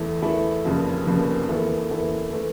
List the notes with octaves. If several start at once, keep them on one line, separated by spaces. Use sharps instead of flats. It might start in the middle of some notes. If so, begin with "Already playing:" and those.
Already playing: E2 E3 A3 E4 A4
E2 E3 A3 E4 A4
F1 F2 C#3 F3 A#3
F1 F2 C#3 F3 A#3
E2 E3 A#3 E4 A4
E2 E3 A#3 E4 A4
E3 A3